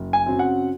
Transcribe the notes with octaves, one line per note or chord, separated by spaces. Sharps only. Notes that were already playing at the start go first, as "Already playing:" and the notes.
Already playing: F#1
G#5
F#2 C#3 F#3 C4
F#5